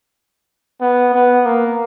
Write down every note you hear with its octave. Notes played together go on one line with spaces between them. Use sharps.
B3
B3
A#3